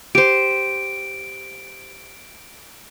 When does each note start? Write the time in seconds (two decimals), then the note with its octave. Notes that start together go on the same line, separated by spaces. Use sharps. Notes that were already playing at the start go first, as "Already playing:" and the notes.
0.15 G4 C5 D7